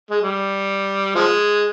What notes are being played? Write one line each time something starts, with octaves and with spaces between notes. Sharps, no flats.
G#3
G3
F3 G#3